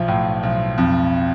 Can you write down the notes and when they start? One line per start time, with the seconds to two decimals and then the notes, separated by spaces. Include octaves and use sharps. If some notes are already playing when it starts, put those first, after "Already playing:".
Already playing: B1 F3
0.08 A2
0.43 B1
0.78 F2